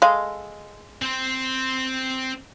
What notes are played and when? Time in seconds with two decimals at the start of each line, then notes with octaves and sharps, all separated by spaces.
0.02 G#3 A4 D#5 F5
1.02 C4 C5